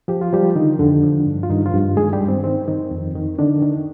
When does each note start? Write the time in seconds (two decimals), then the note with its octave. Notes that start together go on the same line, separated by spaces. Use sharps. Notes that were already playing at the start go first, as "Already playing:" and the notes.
0.08 F3 G4
0.21 F4
0.33 F3 G3 G4
0.56 D3 D#3 D#4
0.79 F2 D3 D4
1.03 F3
1.26 G2
1.43 F4
1.50 G2 D#3 D#4
1.66 F3 F4
1.73 G2
1.97 D#3 G#3 G#4
2.13 G3 G4
2.21 G2
2.29 C4
2.44 D#3 C4
2.68 D#3
2.91 F2
3.15 D#3
3.38 D3 D#3 D4
3.62 D#3